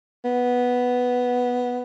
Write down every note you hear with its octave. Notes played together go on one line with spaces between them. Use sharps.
B3